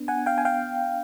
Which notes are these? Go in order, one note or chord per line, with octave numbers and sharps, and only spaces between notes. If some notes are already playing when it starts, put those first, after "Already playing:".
Already playing: B3 D4
F#5 G#5
F5 G5
G#5
F5 G5